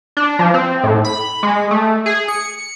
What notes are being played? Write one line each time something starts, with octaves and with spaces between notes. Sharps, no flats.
D4
F3
C4
A2
B5
G#3
A3
G#4
C#7